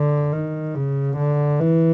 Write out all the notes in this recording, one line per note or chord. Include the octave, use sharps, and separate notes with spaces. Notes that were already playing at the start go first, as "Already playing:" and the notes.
Already playing: D3
D#3
C#3
D3
E3